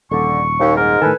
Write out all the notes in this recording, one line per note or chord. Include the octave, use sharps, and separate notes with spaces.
D#1 D3 C#6
D#2
G#2 A#4
A2 D#3 A4 B4 G#5